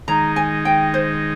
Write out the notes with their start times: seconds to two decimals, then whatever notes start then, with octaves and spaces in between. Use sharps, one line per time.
0.08 D#3 G#3 D#4 A#5
0.36 G#5
0.65 G5
0.94 C5